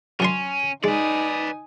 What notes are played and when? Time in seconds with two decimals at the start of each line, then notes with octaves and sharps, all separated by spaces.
0.20 F#2 C#4 D4 C6
0.84 G#3 D#4 B4 D5 G#5 D#6